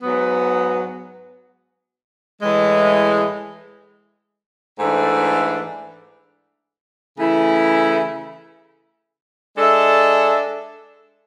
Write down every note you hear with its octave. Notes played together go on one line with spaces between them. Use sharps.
G#2 F#3 B3
A2 E3 G#3
G#2 E3 A3 D4 A4
C#3 E3 A3 E4
G#3 D4 A4 E5